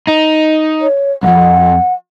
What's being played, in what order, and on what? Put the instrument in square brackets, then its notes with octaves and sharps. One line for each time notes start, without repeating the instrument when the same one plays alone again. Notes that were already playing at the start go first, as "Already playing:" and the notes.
[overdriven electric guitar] D#4
[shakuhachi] C#5
[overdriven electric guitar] B1 F2 [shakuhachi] F#5